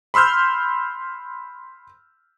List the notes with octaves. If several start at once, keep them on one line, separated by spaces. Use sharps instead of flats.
B5 C6 E6 F6 G6